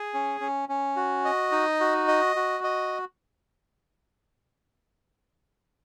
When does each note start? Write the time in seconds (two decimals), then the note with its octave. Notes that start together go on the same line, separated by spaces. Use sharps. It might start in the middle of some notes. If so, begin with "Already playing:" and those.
Already playing: G#4
0.14 C#4
0.41 C#4
0.69 C#4
0.96 F#4
1.25 D#5
1.52 D#4
1.80 F#4
2.08 D#5
2.36 F#4
2.64 D#5